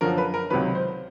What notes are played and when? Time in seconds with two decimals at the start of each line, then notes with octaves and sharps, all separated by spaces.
0.01 F#2 D3 F3 A#4
0.18 B4
0.34 A#4
0.50 C#2 C3 D#3 F#3 B4
0.75 C5